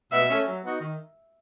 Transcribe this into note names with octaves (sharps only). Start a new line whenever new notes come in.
B2 E5
A3 C#4
F#3
B3 D#4 F#4
D#3